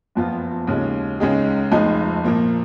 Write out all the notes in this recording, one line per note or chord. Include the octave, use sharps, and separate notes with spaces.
F#1 F2 F3 B3 F4
D#2 C#3 G#3
C#2 C#3 G#3 D#4 G#4
F1 F2 F3 G#3 D#4
A#2 F3 A#3